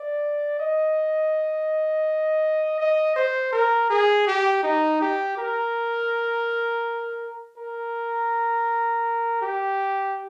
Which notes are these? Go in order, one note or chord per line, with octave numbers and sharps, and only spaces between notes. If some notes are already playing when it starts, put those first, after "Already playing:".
Already playing: D5
D#5
D#5
C5
A#4
G#4
G4
D#4
G4
A#4
A#4
G4